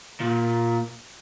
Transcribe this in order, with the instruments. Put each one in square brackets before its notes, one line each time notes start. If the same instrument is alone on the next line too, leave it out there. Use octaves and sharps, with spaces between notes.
[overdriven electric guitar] A#2